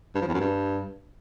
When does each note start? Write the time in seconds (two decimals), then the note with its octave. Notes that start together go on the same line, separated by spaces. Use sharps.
0.15 G2
0.21 F3
0.28 E2
0.34 F#2
0.40 G2